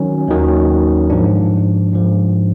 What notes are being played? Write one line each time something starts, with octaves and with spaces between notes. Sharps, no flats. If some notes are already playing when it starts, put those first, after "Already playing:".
Already playing: D#3 F#3 C#4
D#2 D#3 F#3
G#2 F3 D4
G#2 F3